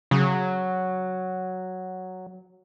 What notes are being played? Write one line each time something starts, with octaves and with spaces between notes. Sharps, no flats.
C#3 F#3